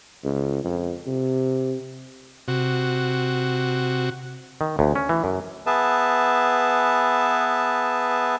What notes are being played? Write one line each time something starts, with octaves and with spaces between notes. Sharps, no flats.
C#2
F2
C3
C3 F#4
D#3
D2
C#4
E3
F#2
B3 G#4 B4 E5 A5